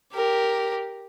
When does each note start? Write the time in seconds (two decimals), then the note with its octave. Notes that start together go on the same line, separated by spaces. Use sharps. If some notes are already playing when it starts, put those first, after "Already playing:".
0.13 G4 A#4